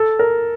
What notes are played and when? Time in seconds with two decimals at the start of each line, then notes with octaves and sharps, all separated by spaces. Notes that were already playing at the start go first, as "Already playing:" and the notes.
Already playing: A4
0.19 A#4